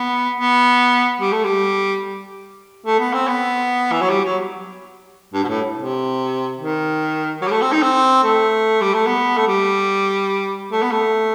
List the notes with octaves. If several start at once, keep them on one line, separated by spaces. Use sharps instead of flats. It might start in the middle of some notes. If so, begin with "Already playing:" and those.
Already playing: B3
B3
G3
A3
G3
A3
B3
C4
B3
E3
F#3
G3
F#3
G2
B2
A2
C3
D#3
F#3
G3
A3
C4
D#4
C4
A3
G3
A3
B3
A3
G3
A3
B3
A3